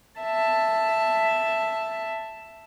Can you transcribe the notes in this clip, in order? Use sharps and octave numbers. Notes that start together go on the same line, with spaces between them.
E5 A5